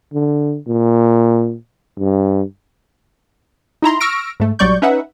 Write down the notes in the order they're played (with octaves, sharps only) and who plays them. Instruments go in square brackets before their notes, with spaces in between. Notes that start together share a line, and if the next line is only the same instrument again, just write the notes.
[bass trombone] D3
A#2
G2
[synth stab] D#4 E4 A#5 C6
C#6 E6 F6 A#6 D7
G#2 A3
A#1 F#3 G3 D5 C#6 G6
C#4 D#4 B4 E5 F#5